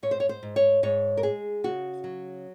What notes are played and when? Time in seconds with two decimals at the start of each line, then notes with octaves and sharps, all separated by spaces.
0.03 G#2 C#5
0.11 C5
0.20 C#5
0.29 C5
0.43 G#2
0.56 C#5
0.83 G#2 C#5
1.17 A#4
1.23 G#3 G#4
1.64 C#3 F#4
2.04 F#3